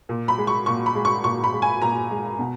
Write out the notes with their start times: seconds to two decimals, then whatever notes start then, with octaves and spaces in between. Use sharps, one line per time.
0.09 A#2
0.28 B5
0.38 G#3
0.47 C#6
0.66 A#2 C#6
0.86 B5
0.95 G#3
1.05 C#6
1.24 A#2 C#6
1.44 B5
1.53 G#3
1.62 G#5
1.82 A#2 A#5
2.11 G#3
2.39 B2